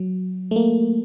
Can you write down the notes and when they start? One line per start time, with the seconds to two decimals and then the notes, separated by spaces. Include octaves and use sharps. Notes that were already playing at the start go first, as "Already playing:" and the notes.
Already playing: F#3
0.51 A3
0.56 A#3